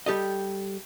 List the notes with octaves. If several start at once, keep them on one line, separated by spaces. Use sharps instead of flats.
G3 G4 A4 D#5